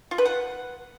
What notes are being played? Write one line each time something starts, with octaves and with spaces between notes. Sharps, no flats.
F4
B4
F#5